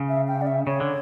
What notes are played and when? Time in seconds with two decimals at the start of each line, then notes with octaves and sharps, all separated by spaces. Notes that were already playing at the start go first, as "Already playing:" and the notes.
Already playing: C#3
0.09 E5
0.28 G5
0.41 D5
0.47 E5
0.66 C#3 C#5
0.80 D3